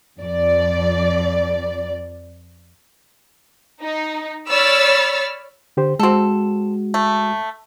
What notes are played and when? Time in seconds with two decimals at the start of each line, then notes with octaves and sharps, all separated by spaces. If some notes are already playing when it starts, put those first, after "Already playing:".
0.19 F2 D5
3.82 D#4
4.49 C#5 D5 B5 E6 F6 A6
5.77 D3 G4 C5
5.99 G#3 C4 F#4 A4
6.94 A3